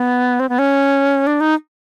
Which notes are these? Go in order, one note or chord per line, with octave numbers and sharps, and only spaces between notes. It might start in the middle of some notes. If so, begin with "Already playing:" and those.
Already playing: B3
C4
B3
C#4
D4
D#4